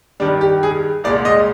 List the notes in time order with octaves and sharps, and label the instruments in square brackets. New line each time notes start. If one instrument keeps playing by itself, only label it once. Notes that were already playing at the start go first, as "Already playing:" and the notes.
[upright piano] G2 D#3 G3 D4
G4
G#4
C2 A#2 G#3 D5
D#5